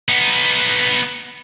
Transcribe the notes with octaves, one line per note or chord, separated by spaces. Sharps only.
B3 D#4